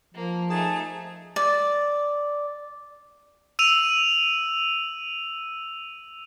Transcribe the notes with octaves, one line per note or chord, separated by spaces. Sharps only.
F3 A#3
A3 D#4 G#4 A5
D5
E6 D#7 F7